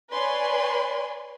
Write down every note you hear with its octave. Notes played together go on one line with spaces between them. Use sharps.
B4 C#5 D5 G#5 C6